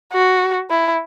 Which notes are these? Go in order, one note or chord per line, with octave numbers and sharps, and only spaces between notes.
F#4
E4